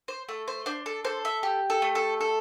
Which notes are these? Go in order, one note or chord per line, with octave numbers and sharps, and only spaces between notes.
C5
A3 A4
C5
D4 C5
A4
A4 C5
E5
G4
A4
A3
A4
A4